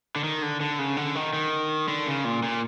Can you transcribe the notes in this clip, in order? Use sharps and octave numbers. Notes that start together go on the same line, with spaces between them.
D3
D#3
D3
D3
C#3
D3
D#3
D#3
D3
C#3
A#2
A#2